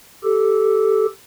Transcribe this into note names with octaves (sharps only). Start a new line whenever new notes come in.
G4 A4